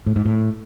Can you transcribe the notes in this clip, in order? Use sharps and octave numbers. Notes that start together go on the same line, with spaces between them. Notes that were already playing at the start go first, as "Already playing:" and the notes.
A2
G#2
A2